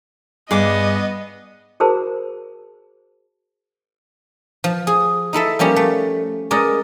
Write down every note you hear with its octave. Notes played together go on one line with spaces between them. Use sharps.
G2 B3 G#4 D#5 D6 D#6
F#4 G#4 A#4 C5 A5 B5
F3
G#4
D#4 E4 A4 E5
F3 G3 A#3 C#4 G4
A3
G#3 C#4 A#4 D5 D#5